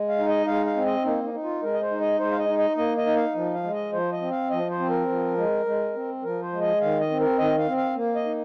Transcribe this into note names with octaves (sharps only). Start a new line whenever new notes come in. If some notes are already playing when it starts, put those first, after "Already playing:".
Already playing: G#3
F5
D#4
D#5
G#3 F5
F5
C4
D#5
A#3 D#4
D#4
D#4
F4
G#3 A#4
D#5
C5
D#4
D#5
G#3 C5
F5
D#5
D#4
D#5
A#3 D#5
D#5
D#4
F5
F3
F5
G#3
D#5
F3 C5
D#5
C4
F5
F3 D#5
C5
C4
A#4
F3
G#3
G#3
C4
F3 A#4
C5
G#3
D#5
D#3 F5
D#5
C4
A#4
D#3 D#5
F5
C4
F5
A#3
D#5
D#4